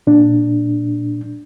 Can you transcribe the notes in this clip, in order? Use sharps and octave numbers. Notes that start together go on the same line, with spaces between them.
A#2 D4